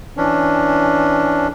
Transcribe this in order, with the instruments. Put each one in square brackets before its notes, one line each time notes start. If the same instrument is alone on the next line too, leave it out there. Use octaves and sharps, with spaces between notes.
[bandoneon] E3 C#4 D4